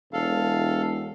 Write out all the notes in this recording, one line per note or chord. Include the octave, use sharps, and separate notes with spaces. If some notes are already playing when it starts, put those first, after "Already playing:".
E1 A4 F5